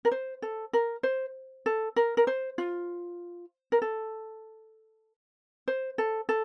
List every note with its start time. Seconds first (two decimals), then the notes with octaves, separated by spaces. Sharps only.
0.05 A#4
0.12 C5
0.42 A4
0.73 A#4
1.03 C5
1.66 A4
1.96 A#4
2.17 A#4
2.27 C5
2.58 F4
3.72 A#4
3.82 A4
5.68 C5
5.98 A4
6.29 A4